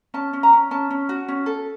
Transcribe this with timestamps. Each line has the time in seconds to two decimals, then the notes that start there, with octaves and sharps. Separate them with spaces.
0.14 C#4 A5
0.33 C#4
0.43 A#5
0.53 C#4
0.71 C#4 A5
0.90 C#4
1.09 F#4
1.28 C#4
1.46 A4